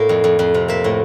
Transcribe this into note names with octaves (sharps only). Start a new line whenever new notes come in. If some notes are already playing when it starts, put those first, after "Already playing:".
Already playing: A2 A#3 D5 E5
F2
F2
F2
C3
A#3 E5
A2